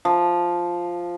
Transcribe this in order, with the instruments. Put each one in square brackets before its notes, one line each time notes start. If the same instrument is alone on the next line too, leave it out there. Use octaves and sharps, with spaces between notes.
[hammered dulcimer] F3